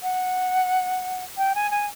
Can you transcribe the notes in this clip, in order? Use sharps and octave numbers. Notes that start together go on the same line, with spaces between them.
F#5
G5
G#5
G#5